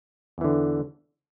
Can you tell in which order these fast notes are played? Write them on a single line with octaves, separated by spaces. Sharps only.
E2 E3 D3